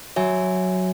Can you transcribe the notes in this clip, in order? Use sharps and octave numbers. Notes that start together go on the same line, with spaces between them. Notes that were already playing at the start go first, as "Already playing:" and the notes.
F#3 F#4 C#5 E5 G#5